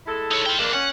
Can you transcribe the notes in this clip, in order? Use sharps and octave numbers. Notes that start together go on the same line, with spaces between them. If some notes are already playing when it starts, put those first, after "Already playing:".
G#3 E4 A4
D#4 C#5
F4 G5
E2 G#3 A#3 D4
C#4 F#5